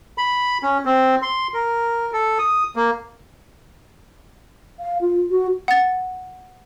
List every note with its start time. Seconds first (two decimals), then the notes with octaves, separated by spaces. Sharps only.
0.18 B5
0.63 C#4
0.85 C4
1.22 C6
1.54 A#4
2.13 A4
2.39 D#6
2.76 A#3
4.80 F5
5.01 F4
5.31 F#4
5.68 F#5 A6